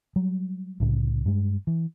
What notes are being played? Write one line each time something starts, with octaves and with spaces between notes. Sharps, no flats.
F#3 G3
C2 A2 C#3
G2 G#3
E3